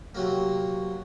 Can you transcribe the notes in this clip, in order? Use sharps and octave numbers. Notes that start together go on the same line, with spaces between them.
C3 F#3 A#3